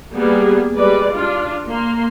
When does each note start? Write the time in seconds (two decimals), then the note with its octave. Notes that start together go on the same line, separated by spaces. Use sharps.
0.12 G3 A#3 B3 G4 G#4
0.76 G3 G#3 B4 D5
1.12 D4 F4
1.66 A#3 C6